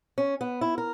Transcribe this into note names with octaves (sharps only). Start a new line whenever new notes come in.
C#4
B3
E4
A#4